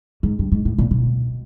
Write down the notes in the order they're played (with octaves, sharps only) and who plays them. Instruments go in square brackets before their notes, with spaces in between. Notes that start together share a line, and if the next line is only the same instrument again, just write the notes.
[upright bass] G#2
G2
G#2
A2
A#2
B2